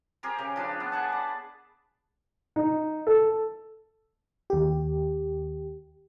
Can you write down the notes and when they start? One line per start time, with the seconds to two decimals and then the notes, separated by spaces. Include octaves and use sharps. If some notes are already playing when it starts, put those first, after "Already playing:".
0.23 C4 G4 G#4 A#4
0.39 C#3
0.56 F3 D4 B4
0.80 B3
0.92 G#4 F#5 A5
1.12 D5
2.56 D#4
3.07 A4
4.50 D#2 G4